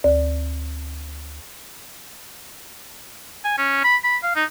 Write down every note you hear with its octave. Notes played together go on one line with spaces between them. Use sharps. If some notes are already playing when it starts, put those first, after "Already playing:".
D2
G#5
C#4
B5
B5
F5
D#4